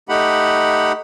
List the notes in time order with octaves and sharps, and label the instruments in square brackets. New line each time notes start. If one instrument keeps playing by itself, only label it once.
[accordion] A3 D#4 G4 F#5 B5